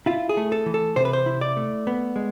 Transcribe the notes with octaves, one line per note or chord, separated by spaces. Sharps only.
E4 F4
G#4
A3
A4
E3
A4
C3 C5
B4
C5
E4
D5
A3
B3
G#3